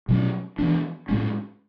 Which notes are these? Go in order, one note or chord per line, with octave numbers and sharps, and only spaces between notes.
B2 F#3 C#4
E3 B3 D4
A2 G#3 C#4